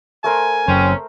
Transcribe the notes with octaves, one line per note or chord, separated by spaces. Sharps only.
A3 A#4 C5 G#5
F#1 F#2 C4 C#4